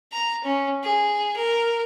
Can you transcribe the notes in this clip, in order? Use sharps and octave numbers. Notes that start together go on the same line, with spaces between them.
A#5
C#4
G#4
A#4